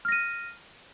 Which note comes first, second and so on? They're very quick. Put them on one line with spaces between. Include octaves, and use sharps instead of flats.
F6 A#6 D#7